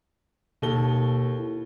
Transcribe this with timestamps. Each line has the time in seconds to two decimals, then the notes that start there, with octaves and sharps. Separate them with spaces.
0.62 D#2 B2 A4 G7
1.39 E4